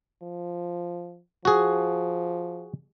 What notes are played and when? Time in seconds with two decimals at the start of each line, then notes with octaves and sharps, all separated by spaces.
0.23 F3
1.45 F3 F#4 G#4